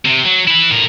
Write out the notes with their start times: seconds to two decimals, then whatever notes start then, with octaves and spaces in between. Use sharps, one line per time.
0.05 C3
0.25 F#3
0.47 E4 B4
0.71 A2 A#4